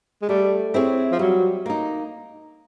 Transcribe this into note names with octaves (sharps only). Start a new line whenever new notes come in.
G#3
G3 A3
C4 E4 G#4 C#5
F3
F#3 G3
A#3 D#4